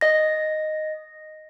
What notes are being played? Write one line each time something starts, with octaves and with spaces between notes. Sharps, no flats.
D#5 A#6